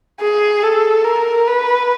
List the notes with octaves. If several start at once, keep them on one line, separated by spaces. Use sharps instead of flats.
G#4
A4
A#4
B4